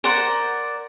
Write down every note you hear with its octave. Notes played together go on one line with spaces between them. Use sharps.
A#4 C5 D5 F#5